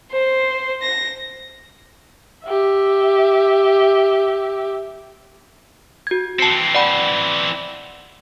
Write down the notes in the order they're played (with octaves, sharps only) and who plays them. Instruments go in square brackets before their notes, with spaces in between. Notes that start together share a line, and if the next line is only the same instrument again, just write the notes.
[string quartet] C5
A#6
[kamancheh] G4 E5
[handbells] F#4 G#6
[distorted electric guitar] E3 C4 [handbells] A5 C7 C#7
[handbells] D5 F#5 B5